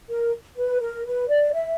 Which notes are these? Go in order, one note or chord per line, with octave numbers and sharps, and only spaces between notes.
A#4
B4
A#4
B4
D5
E5